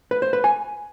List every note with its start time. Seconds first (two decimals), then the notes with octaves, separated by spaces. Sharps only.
0.11 B4
0.22 C5
0.33 B4
0.44 G#5